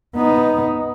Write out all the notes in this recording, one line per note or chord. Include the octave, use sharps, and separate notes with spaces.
B3 D#4